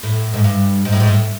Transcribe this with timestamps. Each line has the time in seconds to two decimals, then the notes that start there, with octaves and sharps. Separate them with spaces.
0.03 A2
0.34 G#2
0.44 G2
0.85 G#2
0.92 A2
1.00 G#2
1.08 A2